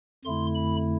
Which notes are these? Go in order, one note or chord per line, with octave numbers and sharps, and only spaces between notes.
F2 D3 A3 E4 C6
B5